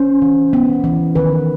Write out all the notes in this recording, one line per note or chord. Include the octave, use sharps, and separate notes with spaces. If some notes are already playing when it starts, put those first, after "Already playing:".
Already playing: C#4 C5
E3
B3
E3
D#3 B4